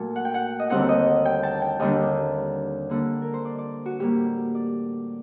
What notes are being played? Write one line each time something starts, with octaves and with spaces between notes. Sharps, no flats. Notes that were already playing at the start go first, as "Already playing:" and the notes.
Already playing: A#2 F#3 A3 A5
F#5
G5
F#5
D#5
D#2 D3 G3 C4 D#4 F#5
D#5
G5
A5
G5
D#2 D3 G3 D4 D#5
D3 G3 A#3
A#4
C5
D5
D5
F#4
A2 G3 A#3 G4
D5